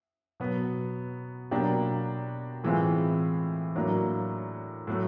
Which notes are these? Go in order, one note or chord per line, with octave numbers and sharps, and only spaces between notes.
B2 F#3 B3
B2 F#3 A#3 D4 G4
A2 E3 G#3 C4 F4
A2 F#3 A#3 D4
A2 F#3 A3